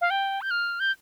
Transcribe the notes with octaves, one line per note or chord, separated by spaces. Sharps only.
F5
G5
G6
F6
G6